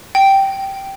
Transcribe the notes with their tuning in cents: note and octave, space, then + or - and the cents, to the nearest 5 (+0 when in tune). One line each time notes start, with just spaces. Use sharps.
G5 -10